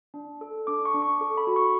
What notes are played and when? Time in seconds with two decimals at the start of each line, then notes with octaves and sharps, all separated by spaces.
0.14 D4
0.41 A4
0.67 D4 D6
0.85 C#6
0.94 D4
1.02 C#6
1.21 A4
1.38 B5
1.47 F#4
1.56 C#6